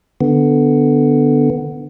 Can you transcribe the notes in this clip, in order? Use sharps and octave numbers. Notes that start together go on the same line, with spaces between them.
D3 B3